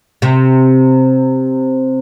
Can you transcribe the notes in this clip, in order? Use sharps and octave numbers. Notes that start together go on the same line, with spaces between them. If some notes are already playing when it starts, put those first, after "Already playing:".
C3